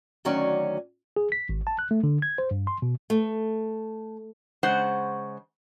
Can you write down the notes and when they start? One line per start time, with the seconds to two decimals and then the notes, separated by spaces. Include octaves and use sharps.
0.25 D2 D#3 F#3 C#4 D5 F#5
1.17 G#4
1.32 B6
1.49 G#1
1.67 A5
1.79 F#6
1.91 A3
2.04 D3
2.22 G#6
2.38 C5
2.51 G2
2.67 C6
2.82 B2
3.10 A3
4.63 C#3 G#3 C5 F#5